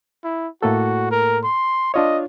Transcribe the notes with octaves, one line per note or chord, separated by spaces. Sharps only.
E4
A2 A#3 F#4 A4
A#4
C6
D4 F4 C#5 D#5